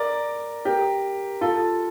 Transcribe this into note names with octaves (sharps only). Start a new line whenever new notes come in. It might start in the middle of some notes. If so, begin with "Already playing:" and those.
Already playing: A#4 D5
G4 A#4
F4 A4